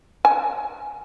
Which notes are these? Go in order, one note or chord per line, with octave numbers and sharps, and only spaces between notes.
G#5